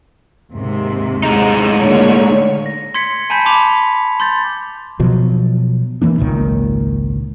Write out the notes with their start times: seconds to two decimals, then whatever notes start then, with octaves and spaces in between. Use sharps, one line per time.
0.54 D#2 G#2 C3
1.23 A2 G#3 D#4
1.81 A#2 D3 C#5
2.66 A#6
2.94 C6 G#6 B6 C#7
3.30 G#5 A5 B5 G6 B6
3.45 A5 B5 C6 D6 F7
4.20 C6 G6 A6
5.00 B2 F3 F#3
6.02 D#3 E3 A#3 D4
6.18 G#1 C#2 A#2 D#3